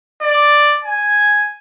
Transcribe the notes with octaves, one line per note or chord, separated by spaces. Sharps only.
D5
G#5